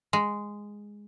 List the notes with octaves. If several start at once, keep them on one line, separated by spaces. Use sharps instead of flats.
G#3